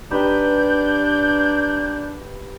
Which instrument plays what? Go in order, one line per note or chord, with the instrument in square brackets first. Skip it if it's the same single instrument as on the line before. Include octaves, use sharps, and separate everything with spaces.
[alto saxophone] D4 [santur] D#4 G4 B4 [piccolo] G6